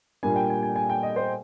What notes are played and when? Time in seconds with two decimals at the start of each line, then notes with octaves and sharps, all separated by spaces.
0.23 A#2 G3 A#3 D4 G#5
0.36 G5
0.50 G#5
0.63 G#5
0.76 G#5
0.90 G5
1.03 D#5
1.16 C5